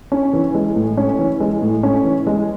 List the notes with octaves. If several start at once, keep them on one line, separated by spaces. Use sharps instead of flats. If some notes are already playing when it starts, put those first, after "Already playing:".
C#4
E3
G#3
A2
C#4
E3
G#3
A2
C#4
E3
G#3